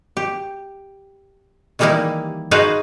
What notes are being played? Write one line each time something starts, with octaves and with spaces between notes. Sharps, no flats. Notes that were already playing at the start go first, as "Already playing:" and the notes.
G4
D#3 E3 G3 A#3 D#4 E4
D#4 F#4 G#4 B4 C5 F5